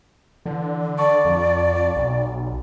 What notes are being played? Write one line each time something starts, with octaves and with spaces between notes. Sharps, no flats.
D3 E3
D5 A5 C#6
F2
B1